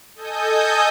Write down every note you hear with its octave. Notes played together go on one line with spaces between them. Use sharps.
A4 D#5 G#5 D#6 G6